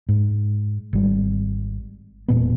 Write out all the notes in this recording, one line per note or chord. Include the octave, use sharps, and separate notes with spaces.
G#2
G#1 G3
E1 A#2 B3